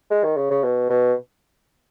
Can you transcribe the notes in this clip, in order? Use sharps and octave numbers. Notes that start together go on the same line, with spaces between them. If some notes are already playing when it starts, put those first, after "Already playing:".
G#3
D#3
C#3
C#3
B2
B2